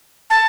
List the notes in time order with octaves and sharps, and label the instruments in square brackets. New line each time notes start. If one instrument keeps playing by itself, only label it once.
[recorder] A5